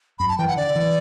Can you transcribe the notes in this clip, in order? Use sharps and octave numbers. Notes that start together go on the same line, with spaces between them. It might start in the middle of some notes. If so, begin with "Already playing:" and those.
F#2 B5
A5
E3 G5
F#5
D3 D5
E3